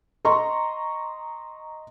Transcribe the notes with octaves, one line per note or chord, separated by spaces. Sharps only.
D#5 A#5 C6 C#6